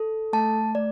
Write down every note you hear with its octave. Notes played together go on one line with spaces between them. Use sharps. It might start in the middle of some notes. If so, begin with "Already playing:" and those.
Already playing: A4
A3 A5
A3 D5